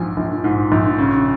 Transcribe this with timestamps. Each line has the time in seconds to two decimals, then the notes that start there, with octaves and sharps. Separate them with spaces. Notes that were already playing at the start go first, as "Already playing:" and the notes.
Already playing: A#1 G#2 F3 G#5
0.17 A#1
0.44 G#2
0.72 A#1
0.99 C#3